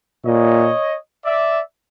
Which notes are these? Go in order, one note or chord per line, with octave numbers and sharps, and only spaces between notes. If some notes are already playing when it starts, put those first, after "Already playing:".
A#2 C#5 D#5
D5 E5